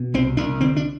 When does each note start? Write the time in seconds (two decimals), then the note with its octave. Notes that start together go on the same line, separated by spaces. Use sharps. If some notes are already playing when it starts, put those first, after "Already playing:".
Already playing: B2
0.14 C2 C4
0.37 C2 D4
0.61 D3 C4
0.76 D4